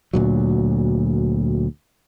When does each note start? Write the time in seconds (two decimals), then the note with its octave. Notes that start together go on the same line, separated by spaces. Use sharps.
0.13 D2 A#2 F#3